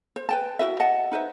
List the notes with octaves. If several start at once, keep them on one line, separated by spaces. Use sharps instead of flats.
C5
B4 G5 A5
E4 F#4 B4 E5
D#5 F#5 A5
D#4 B4 C5 E5